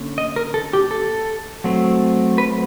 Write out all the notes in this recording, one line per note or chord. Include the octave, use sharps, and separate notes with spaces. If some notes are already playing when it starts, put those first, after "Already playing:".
Already playing: D3 A#3 C#4
D#5
A#4
A4
G4
A4
F#3 A3 C4
B4